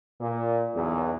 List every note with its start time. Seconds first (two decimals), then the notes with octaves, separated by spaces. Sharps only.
0.20 A#2
0.75 B1 E2